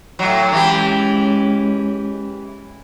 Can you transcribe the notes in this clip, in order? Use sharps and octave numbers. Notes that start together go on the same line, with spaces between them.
A2 F#3
E3 G#3 C#4 G4